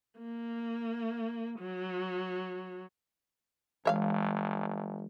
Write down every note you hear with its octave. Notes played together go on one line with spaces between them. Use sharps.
A#3
F#3
G1 E3 G#3 C#5 E5 F5